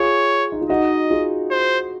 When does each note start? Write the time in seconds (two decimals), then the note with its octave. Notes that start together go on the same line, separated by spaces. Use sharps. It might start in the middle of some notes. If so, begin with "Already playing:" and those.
Already playing: F4 G#4 C#5
0.52 D#4
0.61 F4
0.69 D#4 F#4 D#5
1.10 F4 G#4
1.51 C5